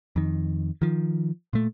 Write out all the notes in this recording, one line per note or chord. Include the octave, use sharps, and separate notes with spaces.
F2 D#3
D#3 F3
A#2 A3